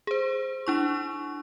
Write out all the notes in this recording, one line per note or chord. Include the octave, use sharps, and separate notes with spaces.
G#4 C5
D4 E4 C#6